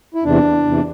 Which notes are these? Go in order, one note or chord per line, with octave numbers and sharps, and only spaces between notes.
E4
E2 C3 E3 D4
E2 C3 E3